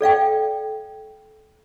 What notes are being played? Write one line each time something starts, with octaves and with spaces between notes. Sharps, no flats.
A4 D5 F5 G5